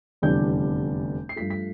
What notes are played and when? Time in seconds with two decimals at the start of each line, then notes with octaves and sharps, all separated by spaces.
0.22 F1 E2 D3 G3 D4 G6
1.29 C7
1.36 G2 F3 A3 B6
1.50 B6